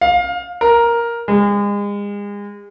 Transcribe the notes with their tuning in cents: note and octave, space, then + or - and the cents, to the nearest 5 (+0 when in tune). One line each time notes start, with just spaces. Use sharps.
F5 +20
A#4 +5
G#3 -35